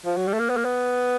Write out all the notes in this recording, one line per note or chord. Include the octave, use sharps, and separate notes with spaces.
F3
F#3
G3
A3
A#3
B3
A#3
B3